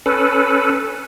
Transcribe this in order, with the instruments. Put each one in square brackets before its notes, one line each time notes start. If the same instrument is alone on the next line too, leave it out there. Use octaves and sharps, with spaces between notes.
[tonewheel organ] C#4 A4 B4